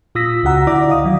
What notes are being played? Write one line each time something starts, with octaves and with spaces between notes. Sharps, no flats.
A#2 F4 D#6 E6 A#6 B6
C#2 C#3 F#4 F#5 A#5 E6
D3 E4 D5 D6 A#6
D#5 F5 D#6
D#3 F#3